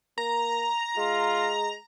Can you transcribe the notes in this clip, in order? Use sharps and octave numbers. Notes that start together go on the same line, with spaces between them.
A#3 A#5
G#3 F4